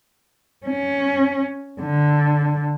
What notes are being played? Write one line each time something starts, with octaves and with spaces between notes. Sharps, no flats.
C#4
D3